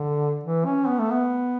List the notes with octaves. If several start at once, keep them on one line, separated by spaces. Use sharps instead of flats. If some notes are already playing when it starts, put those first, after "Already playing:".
Already playing: D3
E3
C#4
B3
A3
B3